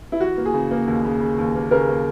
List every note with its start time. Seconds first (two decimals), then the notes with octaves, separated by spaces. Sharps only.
0.12 E4
0.21 E3 F#4
0.37 A#3
0.46 G#4
0.54 C#3
0.71 A#3
0.88 D#2
1.05 C#3
1.21 C#3
1.38 D#2
1.56 A#3
1.71 C#3 A#4
1.89 A#3